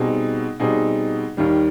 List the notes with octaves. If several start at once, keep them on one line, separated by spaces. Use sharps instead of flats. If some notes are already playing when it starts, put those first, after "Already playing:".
Already playing: B2 G3 C4 D#4 G#4
B2 G3 C4 D#4 G#4
D#2 D#3 G3